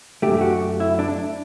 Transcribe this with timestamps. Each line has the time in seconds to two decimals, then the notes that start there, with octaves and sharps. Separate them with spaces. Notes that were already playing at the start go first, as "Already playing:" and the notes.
0.22 F#2 D3 A3 G4
0.41 F#4
0.80 E4
0.99 D4